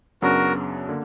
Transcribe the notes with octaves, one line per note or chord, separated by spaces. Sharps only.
F#2 C#3 F#3 B3 D4 F#4 A#4
D3 A#3